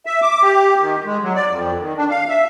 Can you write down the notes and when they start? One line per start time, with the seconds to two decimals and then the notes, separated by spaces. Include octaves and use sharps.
0.06 E5
0.22 D6
0.42 G4
0.81 D#3
1.05 G#3
1.22 F#3
1.35 D5
1.50 F2
1.79 D#3
1.97 D4
2.10 F5
2.28 E5